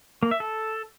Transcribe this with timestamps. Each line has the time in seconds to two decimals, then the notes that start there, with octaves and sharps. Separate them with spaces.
0.23 A#3
0.31 E5
0.40 A4